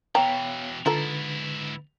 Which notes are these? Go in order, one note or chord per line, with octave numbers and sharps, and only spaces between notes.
B2 E3 B3 C#5 F5 G5 A#5
G#2 D3 E4 F4 A4 B4 A#5 A6